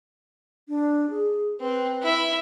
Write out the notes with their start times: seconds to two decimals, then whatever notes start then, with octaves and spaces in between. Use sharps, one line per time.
0.69 D4
1.10 G#4
1.60 C4 B4
2.02 E4 E5